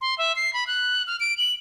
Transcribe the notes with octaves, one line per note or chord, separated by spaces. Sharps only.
C6
E5
C7
B5
F#6
F6
D7
F#7